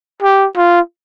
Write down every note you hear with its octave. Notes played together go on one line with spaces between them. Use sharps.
G4
F4